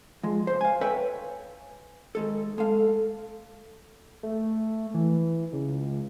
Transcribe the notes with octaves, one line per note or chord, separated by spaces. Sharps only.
F3 G#3
C#2 C5
F5 G#5
A4 B4 C#5 E5 G5 G#5
D#3 G#3 A4
G#3 A4 F5
A3
E3
C#2